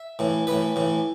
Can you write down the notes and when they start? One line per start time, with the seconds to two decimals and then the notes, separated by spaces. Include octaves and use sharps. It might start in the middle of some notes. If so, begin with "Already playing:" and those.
Already playing: E5
0.19 A2 E3
0.47 A2 E3 B4
0.76 A2 E3